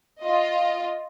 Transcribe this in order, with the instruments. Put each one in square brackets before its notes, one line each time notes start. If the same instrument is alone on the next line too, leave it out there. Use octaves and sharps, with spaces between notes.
[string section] F4 D#5